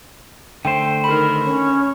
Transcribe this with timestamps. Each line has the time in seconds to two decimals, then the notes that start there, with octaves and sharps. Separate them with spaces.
0.65 D3 A3 C5 G5
1.04 D#3 A#4 B5
1.44 C#4 C#5